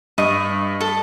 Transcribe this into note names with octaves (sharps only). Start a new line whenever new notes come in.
G2 D#5 C#6
A4